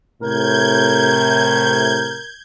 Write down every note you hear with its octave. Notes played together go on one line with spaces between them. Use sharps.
A2 C3 A#4 G6 G#6